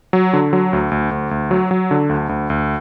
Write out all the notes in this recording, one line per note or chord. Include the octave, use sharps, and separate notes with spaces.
F#3
D3
F#3
D2
D2
D2
D2
F#3
F#3
D3
D2
D2
D2